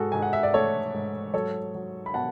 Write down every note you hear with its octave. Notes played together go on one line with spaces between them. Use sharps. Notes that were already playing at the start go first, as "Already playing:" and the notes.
Already playing: G#2 F#4 G#4 A4
G#2 G#5
F#5
E5
D5
A3 A4 C#5
G#2
F#3 A4 C#5
F#3
B5
B2 F#5 A5